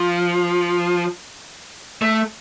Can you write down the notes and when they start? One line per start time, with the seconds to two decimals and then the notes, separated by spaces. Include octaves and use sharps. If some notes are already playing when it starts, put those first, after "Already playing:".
Already playing: F3
2.02 A3